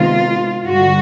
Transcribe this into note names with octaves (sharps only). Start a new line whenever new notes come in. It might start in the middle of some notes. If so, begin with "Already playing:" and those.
Already playing: C3 D#3 G#3 B3 F4
G2 D3 G3 F#4